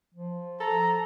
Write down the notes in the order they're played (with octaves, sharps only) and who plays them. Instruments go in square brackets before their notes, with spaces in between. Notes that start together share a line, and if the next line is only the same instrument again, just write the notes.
[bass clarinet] F3
[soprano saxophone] A4 [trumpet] A#5